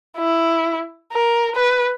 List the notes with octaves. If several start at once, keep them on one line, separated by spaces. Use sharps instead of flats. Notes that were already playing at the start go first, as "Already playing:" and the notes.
E4
A#4
B4